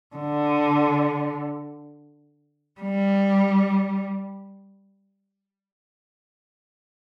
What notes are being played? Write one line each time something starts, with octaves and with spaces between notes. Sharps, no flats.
D3
G3